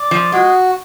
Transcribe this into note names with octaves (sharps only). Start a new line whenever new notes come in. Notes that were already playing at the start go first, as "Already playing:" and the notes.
Already playing: D5
F3
G#3 F#4